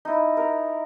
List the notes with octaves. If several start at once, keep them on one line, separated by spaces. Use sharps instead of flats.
D#4 E4
A#4